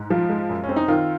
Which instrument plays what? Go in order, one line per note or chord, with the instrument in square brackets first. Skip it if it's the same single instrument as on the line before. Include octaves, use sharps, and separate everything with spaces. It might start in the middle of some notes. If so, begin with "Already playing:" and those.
Already playing: [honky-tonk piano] G#2
[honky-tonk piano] F3 [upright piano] F4
[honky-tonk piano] G#3
F#2
[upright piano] C#4
[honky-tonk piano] C4
[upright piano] D#4
[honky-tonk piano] D#3 [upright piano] F4